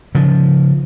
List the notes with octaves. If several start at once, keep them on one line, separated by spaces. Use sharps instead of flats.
C#3 F3